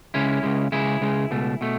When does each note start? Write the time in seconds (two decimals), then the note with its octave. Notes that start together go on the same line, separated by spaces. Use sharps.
0.14 C#2 C#3 G#3 C#4 E4
0.43 C#2 C#3 G#3
0.72 C#2 C#3 G#3 E4 G#4
1.01 C#2 C#3 G#3
1.31 C#2 B2 A3
1.61 B2 A3